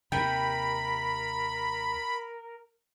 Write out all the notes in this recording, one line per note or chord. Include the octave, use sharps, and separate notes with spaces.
D#2 C3 A#4 G5 B5